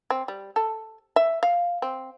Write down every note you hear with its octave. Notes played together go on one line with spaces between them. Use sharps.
C4
G3
A4
E5
F5
C4